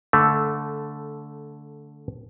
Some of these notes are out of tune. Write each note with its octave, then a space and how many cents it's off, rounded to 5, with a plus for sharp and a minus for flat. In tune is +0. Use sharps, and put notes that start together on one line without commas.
D3 -15 A3 +0